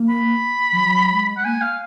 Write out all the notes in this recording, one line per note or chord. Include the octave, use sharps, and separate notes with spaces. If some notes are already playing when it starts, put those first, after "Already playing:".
Already playing: A#3
B5
F3
F#3
G#3
F#5
A#3 G#5
F5